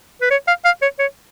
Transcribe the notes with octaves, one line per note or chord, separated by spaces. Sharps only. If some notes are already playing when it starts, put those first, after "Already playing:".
B4
C#5
F5
F5
C#5
C#5